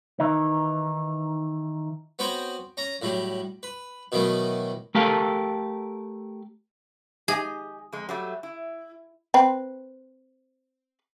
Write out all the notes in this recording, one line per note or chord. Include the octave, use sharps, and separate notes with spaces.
D#3 E3 D#4
B3 C4 F#4 C#5 G5
C#4 A#5
A2 F#3 G3
B4
B2 D#3 E3 F#3 A3
A3 G4 A4 A#4 F5
G4 G#4 D#5 G#5
F2 G#3
F#3 G3 A3
E4
C4 B4